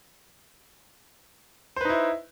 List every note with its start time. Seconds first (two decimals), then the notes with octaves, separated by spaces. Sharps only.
1.76 C5
1.81 B4
1.85 D#4
1.89 E4